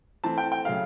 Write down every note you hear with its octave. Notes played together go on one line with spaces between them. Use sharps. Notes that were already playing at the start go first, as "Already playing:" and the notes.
E3 A3 C4 A5
G5
G5
C#3 F#3 A3 F5